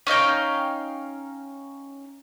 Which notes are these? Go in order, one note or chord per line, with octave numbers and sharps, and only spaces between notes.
C#4 D#4 F5 G5